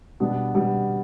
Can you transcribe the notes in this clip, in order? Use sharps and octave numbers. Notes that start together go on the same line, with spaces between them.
B2 G3 B3 D4
B2 G3 B3 D4